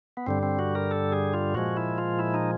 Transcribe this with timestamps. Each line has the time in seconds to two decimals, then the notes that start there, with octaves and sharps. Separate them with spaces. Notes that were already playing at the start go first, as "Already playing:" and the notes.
0.17 B3
0.27 G2 D3 G3 C4
0.43 C4
0.59 F#4
0.75 A#4
0.91 A4
1.12 G#4
1.33 F4
1.54 A#2 F3 G#3 F#4
1.77 E4
1.98 F4
2.19 E4
2.34 D#4